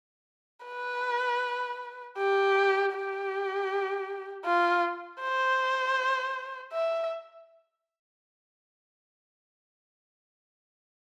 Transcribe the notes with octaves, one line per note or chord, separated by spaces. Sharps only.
B4
G4
G4
F4
C5
E5